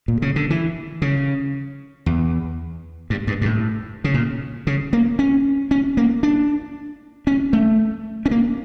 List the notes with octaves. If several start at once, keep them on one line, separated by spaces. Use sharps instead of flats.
A#2
C#3
D3
E3
C#3
E2
G2
G2
G2
A2
C#3
A#2
C#3
A#3
C#4
C#4
A#3
D4
C#4
A3
C#4
A#3